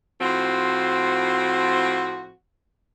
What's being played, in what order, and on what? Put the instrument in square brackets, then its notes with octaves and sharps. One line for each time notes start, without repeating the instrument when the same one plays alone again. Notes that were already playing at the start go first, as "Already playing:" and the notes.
[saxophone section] A2 F3 C4 F#4